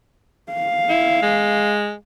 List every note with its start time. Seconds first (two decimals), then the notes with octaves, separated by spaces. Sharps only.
0.52 F5
0.89 E4
1.22 G#3